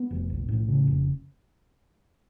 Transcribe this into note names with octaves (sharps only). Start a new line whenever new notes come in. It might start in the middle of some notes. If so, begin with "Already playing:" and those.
Already playing: B3
F1
B1
A2
C#3
F1